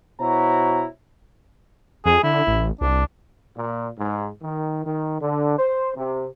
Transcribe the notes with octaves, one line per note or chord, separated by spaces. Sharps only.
B2 E4 F#4 C5 C#5 A#5
F2 G#4
D3 E4
A1
C2 D4
A#2
G#2
D#3
D#3
D3
C5
C3